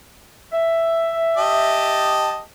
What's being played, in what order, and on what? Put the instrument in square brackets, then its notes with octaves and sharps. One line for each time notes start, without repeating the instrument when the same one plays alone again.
[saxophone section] E5
[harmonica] G4 D#5 A5